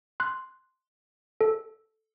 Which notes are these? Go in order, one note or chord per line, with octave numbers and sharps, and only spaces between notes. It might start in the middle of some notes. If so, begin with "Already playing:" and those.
C6 F#6
A4